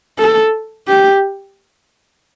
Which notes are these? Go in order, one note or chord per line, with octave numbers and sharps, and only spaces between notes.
A4
G4